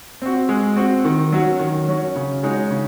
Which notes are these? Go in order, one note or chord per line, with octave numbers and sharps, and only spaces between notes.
C4 F#4
G#3
C4 F#4
D#3
F#3 C#4 F#4
D#3
F#3 C#4 F#4
C#3
G#3 D#4 F#4 C#5
C#3